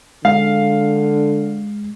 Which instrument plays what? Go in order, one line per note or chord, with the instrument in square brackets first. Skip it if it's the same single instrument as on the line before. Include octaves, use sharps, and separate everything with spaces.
[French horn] D3 [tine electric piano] G#3 [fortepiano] F5